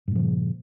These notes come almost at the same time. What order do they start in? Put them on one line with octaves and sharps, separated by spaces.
G2 A#2 F3 C#3